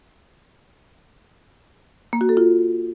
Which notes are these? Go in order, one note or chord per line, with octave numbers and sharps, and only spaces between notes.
A#3
F#4
A4
F4